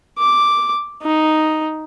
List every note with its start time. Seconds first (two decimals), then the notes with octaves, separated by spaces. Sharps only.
0.18 D6
1.03 D#4